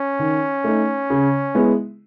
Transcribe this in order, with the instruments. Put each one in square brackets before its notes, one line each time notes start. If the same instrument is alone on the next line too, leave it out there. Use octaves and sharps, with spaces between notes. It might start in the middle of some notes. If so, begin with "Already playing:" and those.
Already playing: [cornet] C#4
[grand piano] D#3
A3 D#4
C#3
G#3 B3 E4